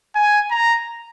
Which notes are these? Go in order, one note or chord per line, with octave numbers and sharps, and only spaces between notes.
G#5
A#5